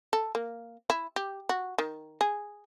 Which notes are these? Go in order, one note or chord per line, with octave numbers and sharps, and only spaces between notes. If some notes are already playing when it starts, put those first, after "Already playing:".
A4
A#3
E4
G4
F#4
D#3
G#4